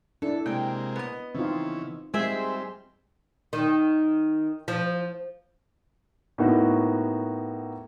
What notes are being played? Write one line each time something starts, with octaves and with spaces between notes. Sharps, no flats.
D4 E4 A4
C3 G#3 A#3 G5
B3 D#5
C#3 E3 C4 D#4 F4
G3 G#3 C4 F4 G#4 C5 E5
D#3
F3
A2 A#3 B3 D#4 F#4